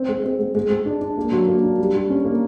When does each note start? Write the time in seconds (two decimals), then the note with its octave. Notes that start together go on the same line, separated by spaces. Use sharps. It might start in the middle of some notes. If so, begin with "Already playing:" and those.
Already playing: C4
0.09 G#3
0.24 C4
0.39 G#3
0.55 G#3
0.70 G#3
0.86 D4
1.01 D4
1.17 A#3
1.32 F#3
1.48 A#3
1.63 D4
1.78 G3
1.94 G3
2.10 C#4
2.25 A#3